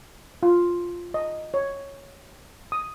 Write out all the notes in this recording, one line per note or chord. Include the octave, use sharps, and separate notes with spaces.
F4
D#5
C#5
D#6